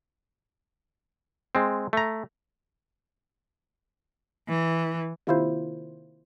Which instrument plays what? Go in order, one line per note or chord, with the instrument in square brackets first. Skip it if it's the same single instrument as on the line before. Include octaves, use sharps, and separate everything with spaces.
[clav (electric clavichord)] G#3 C4
A3 A#5
[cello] E3
[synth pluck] C3 D#3 A#3 E4 F4 C5